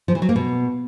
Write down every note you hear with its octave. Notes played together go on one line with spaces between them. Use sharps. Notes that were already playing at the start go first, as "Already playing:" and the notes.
F3
E3
F#3
A#3
B2